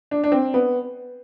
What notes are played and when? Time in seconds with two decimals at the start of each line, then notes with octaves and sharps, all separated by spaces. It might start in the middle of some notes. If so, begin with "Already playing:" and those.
0.11 D4
0.24 D4
0.32 C4
0.54 B3